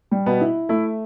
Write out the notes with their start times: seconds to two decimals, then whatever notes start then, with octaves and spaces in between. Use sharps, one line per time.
0.11 G3
0.26 B2 B3
0.41 E4
0.69 A3 E4